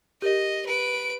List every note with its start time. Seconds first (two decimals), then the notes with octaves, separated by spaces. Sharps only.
0.22 G4 A#4 D#5
0.67 B4 D7